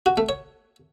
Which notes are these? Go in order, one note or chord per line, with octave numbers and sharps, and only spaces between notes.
F#4
A3
C#5